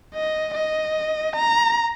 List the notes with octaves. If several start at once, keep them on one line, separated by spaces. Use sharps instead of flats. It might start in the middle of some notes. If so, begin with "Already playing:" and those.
D#5
D#5
A#5